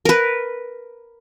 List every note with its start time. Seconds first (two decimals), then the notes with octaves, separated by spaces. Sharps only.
0.05 A#4 B4